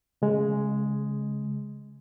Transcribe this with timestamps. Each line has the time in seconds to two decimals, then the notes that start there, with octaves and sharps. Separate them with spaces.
0.22 C#3 G#3